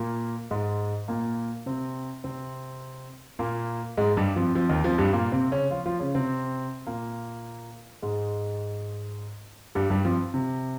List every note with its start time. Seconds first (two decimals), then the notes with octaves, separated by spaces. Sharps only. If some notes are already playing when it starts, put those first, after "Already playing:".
Already playing: A#2 A#3
0.51 G#2 G#3
1.08 A#2 A#3
1.66 C3 C4
2.24 C3 C4
3.39 A#2 A#3
3.97 G#2 G#3
4.17 G2 G3
4.36 F2 F3
4.55 F2 F3
4.69 D#2 D#3
4.84 F2 F3
4.98 G2 G3
5.13 A#2 A#3
5.32 C3 C4
5.51 C#3 C#4
5.71 F3 F4
5.86 F3 F4
5.99 C#3 C#4
6.15 C3 C4
6.87 A#2 A#3
8.02 G#2 G#3
9.75 G2 G3
9.90 G2 G3
10.05 F2 F3
10.34 C3